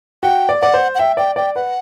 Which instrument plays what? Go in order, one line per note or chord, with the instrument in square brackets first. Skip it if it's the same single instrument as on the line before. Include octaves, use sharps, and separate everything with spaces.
[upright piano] F#4 [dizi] G5
[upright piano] D5
[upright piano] D5 [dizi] F#5
[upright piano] C5
[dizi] F#5
[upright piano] E5 [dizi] G5
[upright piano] D5 [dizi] G5
[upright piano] D5 [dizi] G5
[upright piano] B4 [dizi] F#5